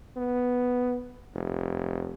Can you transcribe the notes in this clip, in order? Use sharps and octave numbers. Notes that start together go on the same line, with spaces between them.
B3
F1